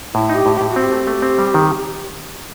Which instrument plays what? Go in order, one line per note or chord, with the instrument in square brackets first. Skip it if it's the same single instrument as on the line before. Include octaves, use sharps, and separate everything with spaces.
[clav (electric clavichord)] A2 [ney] E4
[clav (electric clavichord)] D#4
[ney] G4
[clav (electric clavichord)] A2
[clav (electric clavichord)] A2 [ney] G4
[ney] F#4
[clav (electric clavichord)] C4
[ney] G4
[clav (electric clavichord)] A3
A3
C4
G3
D#3